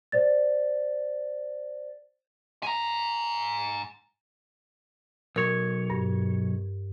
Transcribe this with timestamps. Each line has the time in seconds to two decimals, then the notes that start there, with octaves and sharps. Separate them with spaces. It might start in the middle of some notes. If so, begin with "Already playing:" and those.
0.12 C5 D5 A6
2.63 G#5 A#5
5.36 B1 A#4 C#5
5.90 G2